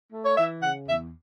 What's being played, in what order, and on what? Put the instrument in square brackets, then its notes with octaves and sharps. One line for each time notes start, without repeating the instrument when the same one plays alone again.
[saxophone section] A3
C#5
E3 E5
C#3 F#5
E2 E5